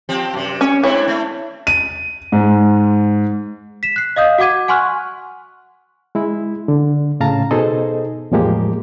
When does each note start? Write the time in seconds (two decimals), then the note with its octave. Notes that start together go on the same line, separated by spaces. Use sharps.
0.09 F3 C4 G4
0.33 F#2 C3
0.61 C#4 C#5
0.83 G#3 C4 D4 E4 C#5
1.08 A3
1.67 D#7
2.32 G#2
3.83 B6 E7
3.96 F#6 C7
4.16 D#5 F5 D#6 G6
4.38 F#4 F#5 D6 G#6 D#7
4.68 F#5 G#5 C6 C#6 F6 F#6
6.15 G#3 E4
6.68 D3
7.20 A2 C#3 F5 A5 A#5
7.51 B2 D#4 G#4 A4 C5 D#5
8.31 E2 A2 F3 G#3 A#3 G4